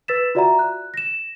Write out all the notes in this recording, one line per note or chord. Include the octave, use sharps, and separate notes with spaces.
B4 E6 A6 B6 E7
F4 F#4 D5 E5 F#5 A#5
F#6
A#6 E7